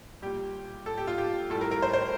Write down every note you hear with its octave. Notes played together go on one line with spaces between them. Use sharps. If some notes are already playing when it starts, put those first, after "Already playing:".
A#2 G3 G4
A4
G4
F4
G4
A2 G3 A4
A#4
A#4
C5
C5